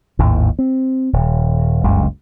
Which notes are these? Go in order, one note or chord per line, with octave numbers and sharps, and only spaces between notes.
G#1 D#2 A2
C4
D#1
F#1 C#2 G2